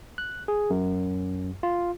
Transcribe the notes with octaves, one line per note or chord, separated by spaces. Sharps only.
F#6
G#4
F#2
F4